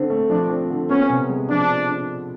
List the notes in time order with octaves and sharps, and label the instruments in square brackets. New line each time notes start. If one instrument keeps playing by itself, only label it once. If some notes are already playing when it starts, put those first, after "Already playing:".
Already playing: [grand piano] D3 C4
A3
[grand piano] F3 [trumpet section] D4
[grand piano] C4
D3
[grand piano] B3 [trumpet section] C#4
[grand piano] C3
G#3
[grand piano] F3 [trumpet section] D4